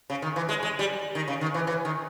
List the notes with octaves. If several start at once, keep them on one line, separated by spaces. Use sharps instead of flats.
C#3
D#3
E3
G#3
G#3
G3
D#3
C#3
D#3
E3
E3
D#3